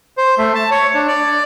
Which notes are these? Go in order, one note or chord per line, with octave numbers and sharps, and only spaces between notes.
C5
A3
A5
C#5
D4
D5